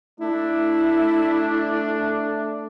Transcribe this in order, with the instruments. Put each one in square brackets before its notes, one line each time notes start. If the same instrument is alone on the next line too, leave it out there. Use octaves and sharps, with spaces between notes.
[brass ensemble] A3 D4 [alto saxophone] E4